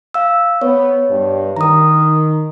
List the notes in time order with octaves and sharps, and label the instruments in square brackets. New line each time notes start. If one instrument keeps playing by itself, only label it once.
[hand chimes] F5 E6
[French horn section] B3 [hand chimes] C#5
[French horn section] G2
[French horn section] D#3 [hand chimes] A#5 D#6